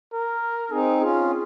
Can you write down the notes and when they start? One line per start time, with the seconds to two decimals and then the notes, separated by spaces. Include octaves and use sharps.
0.13 A#4
0.71 C4 D#4 G#4
1.00 C#4 F4 G#4